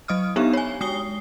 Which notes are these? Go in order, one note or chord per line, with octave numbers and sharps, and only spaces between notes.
F#3 D#5 D#6 F6
B3 D4 D#4 G4 E5 F5
C#5 G#5
G#3 D#6 C7 G7